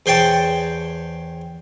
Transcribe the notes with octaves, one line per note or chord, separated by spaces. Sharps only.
E2 C5 C#5 G5 A5